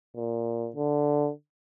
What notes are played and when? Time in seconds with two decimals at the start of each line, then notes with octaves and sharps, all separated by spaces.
0.16 A#2
0.76 D3